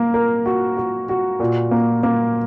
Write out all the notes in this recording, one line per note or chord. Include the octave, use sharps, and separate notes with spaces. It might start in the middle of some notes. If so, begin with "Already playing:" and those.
Already playing: A#3
A#4
F#4
F#4
F#4
A#2
A#3
A#3